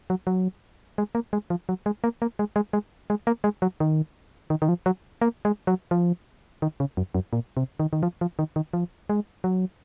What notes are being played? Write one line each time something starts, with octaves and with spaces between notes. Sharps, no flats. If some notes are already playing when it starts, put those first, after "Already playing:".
F#3
F#3
G#3
A#3
G#3
F3
F#3
G#3
A#3
A#3
G#3
G#3
G#3
G#3
A#3
G#3
F#3
D#3
D#3
D#3
F3
F#3
A#3
G#3
F#3
F3
D#3
C#3
F#2
F#2
A#2
C3
D#3
D#3
F3
F3
D#3
D#3
F3
G#3
F#3